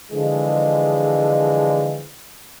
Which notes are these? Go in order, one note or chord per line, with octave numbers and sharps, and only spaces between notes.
D3 E3 F3 G#3